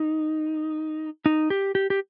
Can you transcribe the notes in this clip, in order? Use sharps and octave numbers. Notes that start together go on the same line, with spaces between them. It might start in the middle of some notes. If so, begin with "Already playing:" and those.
Already playing: D#4
D#4
G4
G4
G4